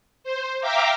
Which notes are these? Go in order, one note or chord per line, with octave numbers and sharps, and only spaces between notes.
C5
E5 F5 G5 A#5 D6